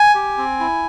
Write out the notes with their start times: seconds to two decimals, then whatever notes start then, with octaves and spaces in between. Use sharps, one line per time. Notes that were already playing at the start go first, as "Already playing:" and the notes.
Already playing: G#5
0.15 G4
0.37 C4
0.60 E4